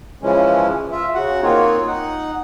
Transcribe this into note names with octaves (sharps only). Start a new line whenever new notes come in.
C#3 E3 F3 G#3 C#4
F4 E5
C#3 F#4 F#5
A#3 C4 D#4 F4 C#5
D#4 F#5